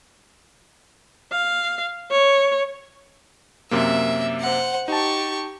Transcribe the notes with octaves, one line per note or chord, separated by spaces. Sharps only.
F5
C#5
F#2 C3 A#3 E5
C5 F#5
D#4 G4 A5 C#6